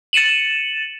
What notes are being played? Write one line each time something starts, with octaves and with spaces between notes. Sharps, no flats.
A6 C#7 D#7 E7 F#7